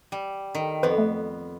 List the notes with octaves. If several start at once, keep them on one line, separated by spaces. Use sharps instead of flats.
G3
D#3
F2 B3 B4 C5
A3